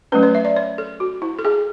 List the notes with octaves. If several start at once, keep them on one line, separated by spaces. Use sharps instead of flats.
F#3 A3 C#4 B4
C#5
E5
D5
C#5
A4
F#4
E4
A4
G#4